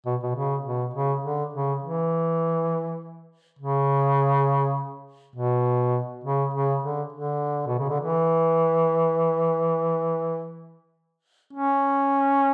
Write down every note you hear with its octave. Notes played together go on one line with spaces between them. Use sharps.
B2
B2
C#3
B2
C#3
D3
C#3
E3
C#3
B2
C#3
C#3
D3
D3
B2
C#3
D3
E3
C#4